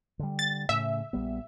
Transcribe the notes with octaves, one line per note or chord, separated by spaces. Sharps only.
D3 G3
A6
A2 C#3 E5
A#1 G3 B3